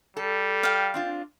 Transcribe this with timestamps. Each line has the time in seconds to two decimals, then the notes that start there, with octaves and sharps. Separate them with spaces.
0.17 G3 A4
0.63 F5 G5
0.94 C4 D4 F4